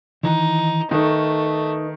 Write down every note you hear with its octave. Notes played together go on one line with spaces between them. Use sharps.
D#3 E3 D#4
D#3 A3 D#4 B4 D#5